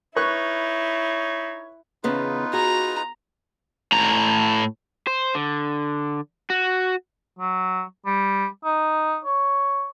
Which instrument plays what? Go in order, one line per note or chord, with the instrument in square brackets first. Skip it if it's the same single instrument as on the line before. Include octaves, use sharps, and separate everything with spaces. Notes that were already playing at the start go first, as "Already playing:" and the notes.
[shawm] D#4 [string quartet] E4 [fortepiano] B4 C#6 F#6 [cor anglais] C#5
[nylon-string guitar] E2 C#3 B3 [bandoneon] D#4 F4 B4
[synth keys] F#4 [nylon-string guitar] G#4 [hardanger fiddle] A#5
[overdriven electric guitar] A2 A#5
C5
D3
F#4
[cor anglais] F#3
G3
D#4
C#5